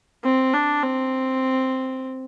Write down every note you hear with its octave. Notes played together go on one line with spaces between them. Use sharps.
C4
D4
C4